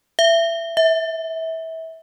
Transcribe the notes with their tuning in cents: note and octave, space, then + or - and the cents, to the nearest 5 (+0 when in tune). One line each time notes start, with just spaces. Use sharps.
E5 +20
E5 -25